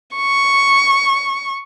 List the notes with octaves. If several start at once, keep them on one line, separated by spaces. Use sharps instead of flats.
C#6